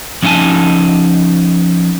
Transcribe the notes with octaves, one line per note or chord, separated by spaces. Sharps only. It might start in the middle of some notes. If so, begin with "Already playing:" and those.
F3 C#4 D#4 F#5 G#5 A5